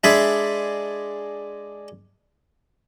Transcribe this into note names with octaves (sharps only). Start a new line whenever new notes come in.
G#3 D4 G#4 E5 B5